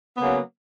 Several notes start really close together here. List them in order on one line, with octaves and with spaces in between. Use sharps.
B3 A#3 C#3 F#3